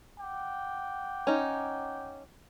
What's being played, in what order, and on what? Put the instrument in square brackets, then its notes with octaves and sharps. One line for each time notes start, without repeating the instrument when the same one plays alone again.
[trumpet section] F#5 G5 D6
[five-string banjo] C#4 D#4